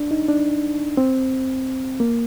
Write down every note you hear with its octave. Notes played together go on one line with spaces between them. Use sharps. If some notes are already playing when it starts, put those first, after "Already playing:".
Already playing: D4
D#4
D4
C4
A#3